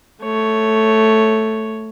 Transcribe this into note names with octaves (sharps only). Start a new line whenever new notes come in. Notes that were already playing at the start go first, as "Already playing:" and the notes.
A3 C#5